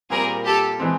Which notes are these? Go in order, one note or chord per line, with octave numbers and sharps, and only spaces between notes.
A#2 G3 C4 G#4 A#4
G4 A4
E3 G#3 C4